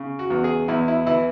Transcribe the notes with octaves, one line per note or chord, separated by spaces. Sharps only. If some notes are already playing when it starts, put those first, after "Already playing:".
Already playing: C#3
F#4
E2
G#4
E2 E4
E4
E3 E4